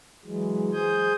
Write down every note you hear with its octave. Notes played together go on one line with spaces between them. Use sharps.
E3 F#3 G#3
G#4 C5 G#5 D#6 G6